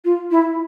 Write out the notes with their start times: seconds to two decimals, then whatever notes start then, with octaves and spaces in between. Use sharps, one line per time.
0.05 F4
0.31 E4